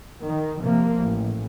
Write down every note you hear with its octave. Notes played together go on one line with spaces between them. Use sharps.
D#3
C3 F3 A#3
A1